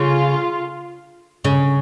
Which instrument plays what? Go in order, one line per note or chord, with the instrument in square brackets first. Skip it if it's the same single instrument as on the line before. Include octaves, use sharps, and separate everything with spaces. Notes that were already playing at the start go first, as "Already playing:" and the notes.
Already playing: [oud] C#3 [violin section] F4
[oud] C#3